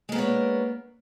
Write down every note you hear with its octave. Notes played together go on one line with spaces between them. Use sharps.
G#3 A#3 B3 D4 C#5